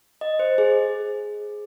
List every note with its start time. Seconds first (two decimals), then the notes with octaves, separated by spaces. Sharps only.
0.21 D#5
0.39 C5
0.58 G#4